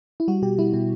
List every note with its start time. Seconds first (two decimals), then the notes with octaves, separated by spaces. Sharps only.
0.20 E4
0.28 G3 F#4
0.42 B2 G4
0.59 G3 E4
0.73 B2 E4